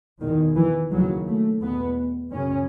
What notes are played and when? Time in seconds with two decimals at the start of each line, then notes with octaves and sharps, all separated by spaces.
0.21 E2 B2 D#3
0.56 E3
0.92 D#2 C#3 F#3
1.27 A3
1.62 E2 B2 B3
2.32 F#2 C#3 C#4